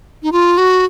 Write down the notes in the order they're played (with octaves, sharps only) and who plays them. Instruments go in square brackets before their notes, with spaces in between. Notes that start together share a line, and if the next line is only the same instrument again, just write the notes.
[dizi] D#4
F4
F#4